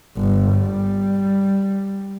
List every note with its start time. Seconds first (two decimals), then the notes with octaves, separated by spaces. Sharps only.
0.17 G1
0.53 G3